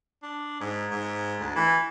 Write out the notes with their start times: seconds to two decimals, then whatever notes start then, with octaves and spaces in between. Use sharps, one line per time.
0.23 D4
0.61 G#2
0.91 G#2
1.40 D2
1.55 E3